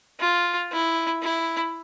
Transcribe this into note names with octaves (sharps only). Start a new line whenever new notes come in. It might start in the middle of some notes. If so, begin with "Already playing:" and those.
F4
E4
E4